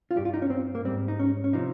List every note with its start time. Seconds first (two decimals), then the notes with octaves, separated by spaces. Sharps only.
0.11 F4
0.16 G2 G3 G4
0.25 F4
0.34 D#4
0.42 C#4
0.50 C4
0.75 A#3
0.85 G#2 G3 C4
1.08 D#4
1.19 C#4
1.44 C#4
1.53 C3 F3 D#4